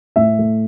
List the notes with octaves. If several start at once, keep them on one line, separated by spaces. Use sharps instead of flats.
A2 E5
A3